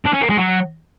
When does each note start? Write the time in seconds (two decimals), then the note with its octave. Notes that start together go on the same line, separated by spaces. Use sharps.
0.05 D4
0.13 C#4
0.21 A#3
0.30 G#3
0.38 F#3